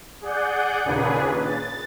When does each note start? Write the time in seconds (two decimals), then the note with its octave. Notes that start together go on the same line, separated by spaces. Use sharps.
0.22 G#4 D5 F#5 G6
0.85 D#2 A#2 C#3 D4 G#4 B4
1.43 A6